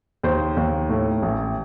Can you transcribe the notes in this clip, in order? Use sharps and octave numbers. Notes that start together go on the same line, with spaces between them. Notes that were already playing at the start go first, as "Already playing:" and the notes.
D#2 C5
D#2
A2
A1